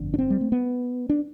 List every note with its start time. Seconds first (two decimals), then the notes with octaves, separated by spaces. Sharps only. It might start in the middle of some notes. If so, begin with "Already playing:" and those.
Already playing: G1 F2 D3
0.14 D4
0.19 C4
0.30 G3
0.41 A3
0.52 B3
1.09 D4